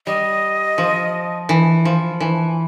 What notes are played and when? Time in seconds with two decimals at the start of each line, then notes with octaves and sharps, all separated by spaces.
0.06 G3 D#5
0.78 F3
1.49 E3
1.85 F3
2.20 E3